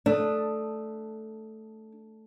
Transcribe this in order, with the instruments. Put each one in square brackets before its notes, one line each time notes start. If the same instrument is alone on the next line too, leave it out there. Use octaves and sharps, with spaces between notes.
[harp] A3 D#6 [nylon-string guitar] D4